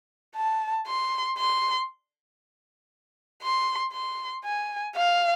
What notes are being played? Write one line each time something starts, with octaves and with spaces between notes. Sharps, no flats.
A5
C6
C6
C6
C6
G#5
F5